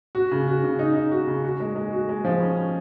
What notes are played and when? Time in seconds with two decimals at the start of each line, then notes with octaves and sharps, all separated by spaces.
0.15 F#4
0.31 C#3
0.48 F#4
0.64 C#3
0.79 D#4
0.95 D#4
1.11 F#4
1.27 C#3
1.44 F#4
1.60 G#3
1.76 G#3
1.93 F#4
2.09 G#3
2.25 F3
2.40 C#4
2.56 C#4